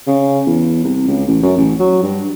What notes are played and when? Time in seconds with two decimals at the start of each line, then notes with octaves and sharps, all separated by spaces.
0.07 C#3
0.47 E2
0.84 C2
1.08 C#2
1.27 A1
1.42 F#2
1.57 A1
1.80 F#3
2.03 G2